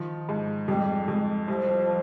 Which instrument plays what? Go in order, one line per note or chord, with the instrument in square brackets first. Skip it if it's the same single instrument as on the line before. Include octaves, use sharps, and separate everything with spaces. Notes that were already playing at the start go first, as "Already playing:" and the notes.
Already playing: [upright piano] D#3 F3
G#2
[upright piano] F2 [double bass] G3
[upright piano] F2 [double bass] G#3
[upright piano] C2 [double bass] F3